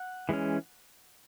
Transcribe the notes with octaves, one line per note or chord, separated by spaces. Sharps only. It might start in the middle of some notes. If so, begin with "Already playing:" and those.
Already playing: F#5
E3 G#3 C#4